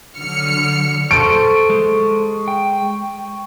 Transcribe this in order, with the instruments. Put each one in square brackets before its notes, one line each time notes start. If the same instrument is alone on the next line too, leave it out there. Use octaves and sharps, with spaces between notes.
[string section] D3 F#3 F6 C#7
[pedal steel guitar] A4 C5 F6 [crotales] C#6 [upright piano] D7
[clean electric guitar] G#3
[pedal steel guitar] G5